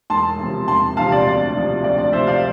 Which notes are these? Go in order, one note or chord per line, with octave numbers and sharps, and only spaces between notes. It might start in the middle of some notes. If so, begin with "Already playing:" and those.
E1 A5 C6
E2 C3 F3
E1 A5 C6
E2 C3 F3 F5 A5
D5
D2
C3 F3
D2 D5
D5
C3 F3 C5 E5
D5 F5